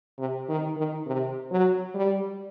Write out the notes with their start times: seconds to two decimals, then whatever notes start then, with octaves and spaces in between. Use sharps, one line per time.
0.19 C3
0.49 D#3
0.77 D#3
1.07 C3
1.51 F#3
1.94 G3